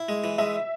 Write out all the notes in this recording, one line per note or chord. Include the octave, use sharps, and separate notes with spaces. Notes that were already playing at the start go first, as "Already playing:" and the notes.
Already playing: E4
G#3
E3
G#3 E5